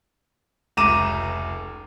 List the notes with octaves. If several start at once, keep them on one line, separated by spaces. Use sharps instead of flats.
F1 C#2 A#5 D6 D#7 E7